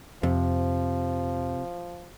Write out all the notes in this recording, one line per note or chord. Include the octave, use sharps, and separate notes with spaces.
F2 C3 F3